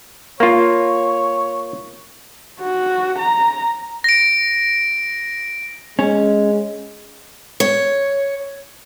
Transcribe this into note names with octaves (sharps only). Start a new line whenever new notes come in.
A#3 F4 C#5
F#4
A#5
A#6 D7
G#3 C#4
C#5